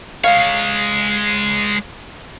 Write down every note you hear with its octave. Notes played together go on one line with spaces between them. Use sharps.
G#3 C#5 F5